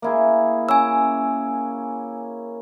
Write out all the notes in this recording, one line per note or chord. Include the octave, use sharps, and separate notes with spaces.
A#3 E4 G#4
C#4 G#5 E6